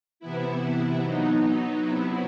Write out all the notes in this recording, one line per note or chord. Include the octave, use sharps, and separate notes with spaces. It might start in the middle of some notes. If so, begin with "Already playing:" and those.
C3 E3 B3 E4
F#3 B3 D#4
C3 F#3 B3 E4